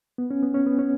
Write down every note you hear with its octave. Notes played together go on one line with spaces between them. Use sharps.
B3
C#4
B3
C#4
B3
C#4